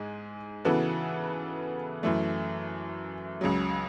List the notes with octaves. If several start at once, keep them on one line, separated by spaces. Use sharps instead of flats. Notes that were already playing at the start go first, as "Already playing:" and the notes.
Already playing: G#2 G#3 G#4
C#3 E3 B3 F#4 A4
F#2 E3 A3
C#2 C#3 F#3